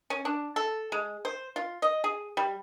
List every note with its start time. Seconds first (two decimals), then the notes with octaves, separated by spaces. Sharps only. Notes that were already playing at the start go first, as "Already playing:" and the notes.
0.10 C#4
0.25 D4
0.56 A4
0.92 G#3
1.25 C5
1.56 F4
1.82 D#5
2.04 G#4
2.37 G3